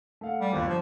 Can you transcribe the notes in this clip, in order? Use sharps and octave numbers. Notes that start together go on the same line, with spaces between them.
A3 F5 F#5
G3
G1 D#2
F3